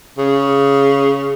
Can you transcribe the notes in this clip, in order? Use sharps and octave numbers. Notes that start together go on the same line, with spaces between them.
C#3